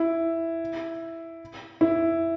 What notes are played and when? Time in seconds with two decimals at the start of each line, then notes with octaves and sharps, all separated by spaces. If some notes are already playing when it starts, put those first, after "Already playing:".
Already playing: E4
1.81 E4